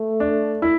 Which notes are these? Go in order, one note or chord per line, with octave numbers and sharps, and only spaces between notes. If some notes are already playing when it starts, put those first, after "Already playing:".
Already playing: A3
D4
E4